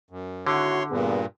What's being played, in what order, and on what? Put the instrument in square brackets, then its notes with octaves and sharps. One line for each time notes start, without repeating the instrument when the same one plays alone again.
[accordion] F#2
[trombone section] G#1 E4 F#4 [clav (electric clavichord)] D3 [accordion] C#5 C6
[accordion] G2 A#2 [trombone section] B3 G#4